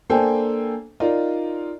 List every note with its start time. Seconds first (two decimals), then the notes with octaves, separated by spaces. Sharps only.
0.10 A#3 D4 A4 C5 G5 G#5
1.00 D#4 F4 A#4 D5 D#5